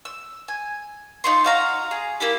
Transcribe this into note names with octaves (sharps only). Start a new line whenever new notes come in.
E6
G#5
D#4 F4 C6
F#4 F5 A#5
G#4
A#3 E4 G4